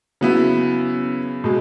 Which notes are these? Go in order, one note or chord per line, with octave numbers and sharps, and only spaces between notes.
C#3 F#3 B3 E4
B2 G#3